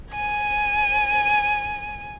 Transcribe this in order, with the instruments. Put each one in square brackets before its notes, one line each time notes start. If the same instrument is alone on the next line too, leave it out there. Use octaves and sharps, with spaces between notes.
[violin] G#5 D#7